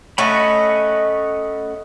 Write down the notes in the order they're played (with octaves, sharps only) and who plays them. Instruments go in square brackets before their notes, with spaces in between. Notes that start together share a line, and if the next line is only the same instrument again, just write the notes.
[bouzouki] A3 C#4 [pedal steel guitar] D#5 F#5 B5